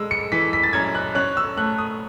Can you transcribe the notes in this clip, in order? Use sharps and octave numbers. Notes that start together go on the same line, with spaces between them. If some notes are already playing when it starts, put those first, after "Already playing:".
Already playing: G#3 E6
C#7
E3 B6
B6
A6
F#2 G#6
F#6
C#4 F#6
E6
A3 F#6
D#6